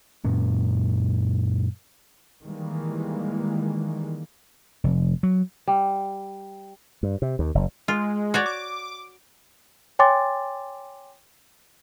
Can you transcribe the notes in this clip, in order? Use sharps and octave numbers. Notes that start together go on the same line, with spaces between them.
F#2 A#2 C#4
D#3 E3 G3 G#3 A#3
F1
F#3
G3
G2
C3
D#2
F#1
G#3 F4
F#4 C#5 D5
D6
C#5 G5 G#5 C6 D6 A6